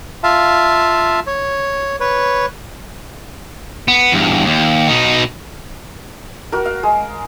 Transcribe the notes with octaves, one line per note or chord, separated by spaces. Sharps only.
F4 E5 F5 A5
C#5
B4 C#5
B3
E2 G2
D#2
B2 D#4
F#4 A#4
F5
G#3